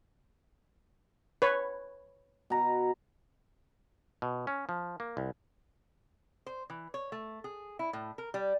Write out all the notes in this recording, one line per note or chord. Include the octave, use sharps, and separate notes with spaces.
B4 C#5
B2 A#5
B2
C#4
F3
A#3
C2
C5
E3
C#5
A3
G#4
E4
A2
A#4
G3